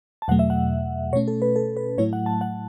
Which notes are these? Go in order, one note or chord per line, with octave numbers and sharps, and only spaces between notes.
A5
E2 B2 F#3 A3 F#5
E5
F#5
B2 A3 C#4 C#5
A4
B4
A4
B4
A2 F#3 A3 E4 C#5
F#5
A5
F#5